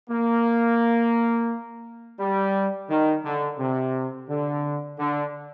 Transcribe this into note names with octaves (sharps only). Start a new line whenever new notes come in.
A#3
G3
D#3
D3
C3
D3
D3